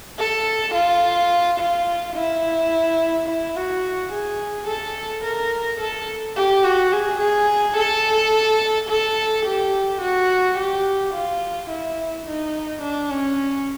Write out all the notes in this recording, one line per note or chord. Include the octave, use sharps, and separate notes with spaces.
A4
F4
F4
E4
E4
F#4
G#4
A4
A#4
A4
G4
F#4
G#4
G#4
A4
A4
G4
F#4
G4
F4
E4
D#4
D4
C#4